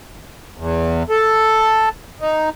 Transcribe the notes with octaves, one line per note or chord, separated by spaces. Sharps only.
E2
A4
D#4